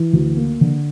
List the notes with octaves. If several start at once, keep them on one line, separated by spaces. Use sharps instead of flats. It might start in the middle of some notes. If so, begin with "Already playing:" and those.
Already playing: E3
D2
A#3
D3